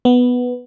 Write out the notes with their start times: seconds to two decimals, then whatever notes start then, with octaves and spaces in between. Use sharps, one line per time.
0.05 B3